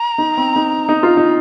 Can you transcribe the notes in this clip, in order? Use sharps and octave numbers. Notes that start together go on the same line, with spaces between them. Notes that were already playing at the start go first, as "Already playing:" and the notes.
Already playing: A#5
D#4
C4
D#4
D#4
F4
D#4